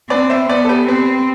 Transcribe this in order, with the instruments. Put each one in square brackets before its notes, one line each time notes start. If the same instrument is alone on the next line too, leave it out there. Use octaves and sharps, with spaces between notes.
[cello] C4 [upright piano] B4 D5
[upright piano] C5 E5
[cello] B3 [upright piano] B4 D5
[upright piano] A4
G4 B4
[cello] C4 [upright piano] G4 B4